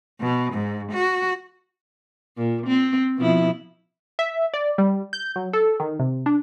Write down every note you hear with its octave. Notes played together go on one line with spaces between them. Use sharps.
B2
G#2
F#4
A#2
C4
B2 F3 E4
E5
D5
G3
G6
F#3
A4
D#3
C3
D4